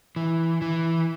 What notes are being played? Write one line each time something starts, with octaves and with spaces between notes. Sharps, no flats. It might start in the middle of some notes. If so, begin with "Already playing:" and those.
E3
E3